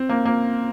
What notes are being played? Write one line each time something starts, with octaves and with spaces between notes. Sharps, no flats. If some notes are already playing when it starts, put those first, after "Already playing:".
Already playing: C4
A#3
A#3